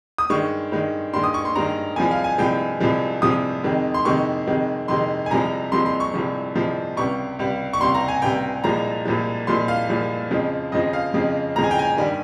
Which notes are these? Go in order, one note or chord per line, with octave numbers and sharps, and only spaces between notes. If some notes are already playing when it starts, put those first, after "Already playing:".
D#6
G2 D#3 G#3 C#6
G2 D#3 G#3
G2 D#3 G#3 C6
D#6
C#6
C6
G2 D#3 G#3 A#5
C2 C3 F3 G#3 G#5
F5
G#5
C2 C3 F3 G#3 G5
C2 C3 F3 G#3
C2 C3 F3 G#3 D#6
F2 C3 D#3 G#3
C6
F2 C3 D#3 G#3 C#6
F2 C3 D#3 G#3
F2 C3 D#3 G#3 C6
G#5
C2 C3 F3 G#3 A#5
C2 C3 F3 G#3 C6
C6
C#6
C2 C3 F3 G#3
C2 C3 F3 G#3
C#2 C3 G3 C#6
C#2 C3 G3
C#6
C#2 C3 G3 C6
A#5
G#5
C#2 C3 G3 G5
C2 A#2 F3 G#3 A#5
C2 A#2 F3 G#3
C2 A#2 F3 G#3 C6
F5
C2 A#2 F3 G#3
F2 C#3 F3 G#3
F2 C#3 F3 G#3 D#5
F5
F2 C#3 F3 G#3
F2 C#3 F3 G#3 A#5
G#5
G5
G#5
G2 D#3 G3